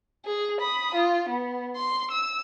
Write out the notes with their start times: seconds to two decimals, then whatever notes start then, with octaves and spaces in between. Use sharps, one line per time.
0.25 G#4
0.60 B5 D#6
0.95 F4
1.29 B3
1.76 C6
2.11 E6